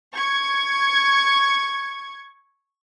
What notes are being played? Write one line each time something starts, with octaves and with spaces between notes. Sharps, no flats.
C#6 G#6